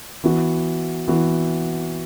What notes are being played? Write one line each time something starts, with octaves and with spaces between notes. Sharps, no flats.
E3 B3 F#4
E3 B3 F#4